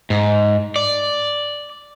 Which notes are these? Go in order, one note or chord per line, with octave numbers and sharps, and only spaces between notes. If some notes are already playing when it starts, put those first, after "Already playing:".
G#2
D5